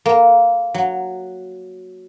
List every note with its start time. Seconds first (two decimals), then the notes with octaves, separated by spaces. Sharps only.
0.06 A#3
0.74 F#3